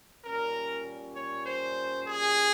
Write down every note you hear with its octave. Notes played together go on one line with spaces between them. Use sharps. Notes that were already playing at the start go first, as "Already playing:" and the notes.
A#2 G3 C#4 A#4
C#5
C5
G#4